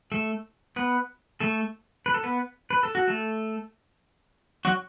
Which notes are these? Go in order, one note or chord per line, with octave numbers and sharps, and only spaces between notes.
A3 A4
B3 B4
A3 A4
B4
A4
B3 B4
B4
A4
F#4
A3 A4
F#3 F#4